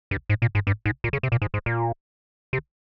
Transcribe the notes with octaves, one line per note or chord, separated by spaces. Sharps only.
G2
G#2
A#2
G#2
G2
G#2
A#2
C#3
C3
A#2
G#2
G#2
A#2
C3